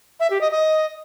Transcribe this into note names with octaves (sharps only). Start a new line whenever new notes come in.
E5
G4
D#5
D#5